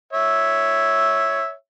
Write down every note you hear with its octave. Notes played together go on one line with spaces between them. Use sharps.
C#5 E5